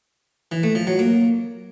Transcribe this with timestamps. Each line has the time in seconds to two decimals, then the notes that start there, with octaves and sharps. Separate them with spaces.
0.52 E3
0.63 A3
0.75 F3
0.87 F#3
0.99 A#3